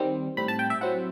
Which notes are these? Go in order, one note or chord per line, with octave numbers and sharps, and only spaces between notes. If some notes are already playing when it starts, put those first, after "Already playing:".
Already playing: D#3 G3 C4
A2 G3 C4 B5
A5
G5
E5
F#3 C4 E4 F#5